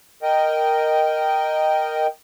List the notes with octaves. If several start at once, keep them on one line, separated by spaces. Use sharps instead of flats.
A#4 D#5 G5